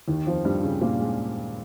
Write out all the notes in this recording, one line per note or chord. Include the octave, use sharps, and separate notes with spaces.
D#2 D#3
F2 F3
G2 G3
C#3
A#2 A#3
G#3